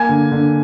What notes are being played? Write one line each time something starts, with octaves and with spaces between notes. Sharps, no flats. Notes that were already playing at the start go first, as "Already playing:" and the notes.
Already playing: A#3 G#5 G#6
D3
D3